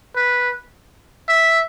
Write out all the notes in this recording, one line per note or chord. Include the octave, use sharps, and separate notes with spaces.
B4
E5